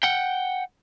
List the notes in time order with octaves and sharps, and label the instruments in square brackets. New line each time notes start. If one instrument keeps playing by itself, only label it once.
[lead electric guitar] F#5 G5